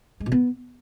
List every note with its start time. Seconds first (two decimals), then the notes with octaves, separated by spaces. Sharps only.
0.20 G#3
0.26 B2
0.32 B3